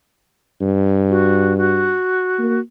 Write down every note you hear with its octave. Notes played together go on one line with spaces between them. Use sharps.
G2
F#4
F#4
A#3